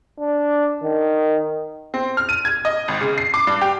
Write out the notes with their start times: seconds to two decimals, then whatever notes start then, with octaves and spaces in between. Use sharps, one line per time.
0.20 D4
0.83 D#3
1.94 C4
2.17 F6
2.29 D#7
2.45 G#6
2.65 D#5
2.88 G#1
3.01 C#3
3.18 C7
3.34 D6
3.47 G2
3.61 G4